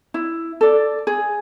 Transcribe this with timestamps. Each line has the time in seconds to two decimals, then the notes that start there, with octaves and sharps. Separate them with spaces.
0.14 E4
0.61 A4 D5
1.07 G#4